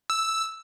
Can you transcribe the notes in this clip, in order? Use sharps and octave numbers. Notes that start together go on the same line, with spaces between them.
E6